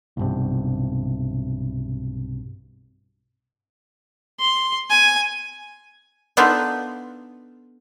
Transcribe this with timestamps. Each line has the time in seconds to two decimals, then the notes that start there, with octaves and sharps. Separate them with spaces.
0.17 B1 G2 C3
4.40 C6
4.90 G#5
6.37 B3 D4 D#4 F4 A4 B4